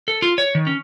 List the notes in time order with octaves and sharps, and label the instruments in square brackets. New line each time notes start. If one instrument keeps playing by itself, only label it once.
[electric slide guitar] A4
F4
C#5
D#3
C#4